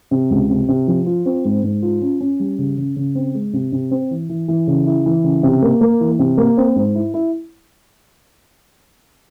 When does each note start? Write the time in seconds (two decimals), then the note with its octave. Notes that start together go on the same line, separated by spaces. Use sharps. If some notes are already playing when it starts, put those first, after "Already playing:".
0.11 C3
0.30 C#2
0.50 C3
0.68 C3
0.87 F3
1.06 F4
1.26 C4
1.45 G#2
1.63 G#2
1.83 F4
2.02 C#4
2.20 C#4
2.39 G3
2.58 C#3
2.77 C#3
2.96 C#3
3.15 C4
3.34 G#3
3.53 C3
3.72 C3
3.91 C4
4.11 E3
4.29 E3
4.48 E3
4.67 C#3
4.86 E4
5.06 E3
5.24 C#3
5.43 C3
5.62 A#3
5.81 A#3
6.00 E3
6.19 C3
6.38 A#3
6.57 C4
6.76 G#2
6.95 E4
7.14 E4